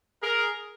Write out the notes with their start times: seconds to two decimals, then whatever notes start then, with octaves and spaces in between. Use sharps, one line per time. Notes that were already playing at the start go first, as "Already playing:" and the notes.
0.23 G#4 A#4